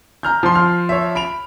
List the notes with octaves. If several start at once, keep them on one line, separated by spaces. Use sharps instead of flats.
A#5 F6 G6
F3 C6
F6
C#5 E5
B5 D7 F7